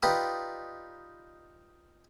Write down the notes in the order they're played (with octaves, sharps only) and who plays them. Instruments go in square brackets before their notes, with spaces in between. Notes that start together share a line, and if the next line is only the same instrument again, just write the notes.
[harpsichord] D#4 F4 G4 B4 D5